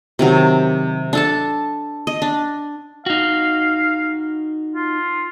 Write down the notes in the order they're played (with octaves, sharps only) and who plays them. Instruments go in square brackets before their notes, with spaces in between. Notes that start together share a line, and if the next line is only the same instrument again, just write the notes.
[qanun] C3 D#3 F#3
D4 A4 A5
D#5
D4
[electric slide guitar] D#4 F#4 [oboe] F5
[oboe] F4